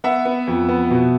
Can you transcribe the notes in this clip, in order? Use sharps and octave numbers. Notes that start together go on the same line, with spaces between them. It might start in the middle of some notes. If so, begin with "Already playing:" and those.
B3 E5 F#5
B3
F2
B3
B2